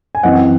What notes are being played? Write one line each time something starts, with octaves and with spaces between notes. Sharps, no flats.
G#5
F#2 E3 C4 D#5 F#5